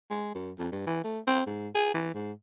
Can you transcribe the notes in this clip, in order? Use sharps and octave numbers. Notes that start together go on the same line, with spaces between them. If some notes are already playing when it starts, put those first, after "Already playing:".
G#3
F#2
F2
G2
E3
A3
C4
G#2
G#4
E3
G#2